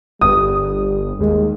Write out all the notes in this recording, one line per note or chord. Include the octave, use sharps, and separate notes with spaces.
G1 G3 D#6
D#2 G#3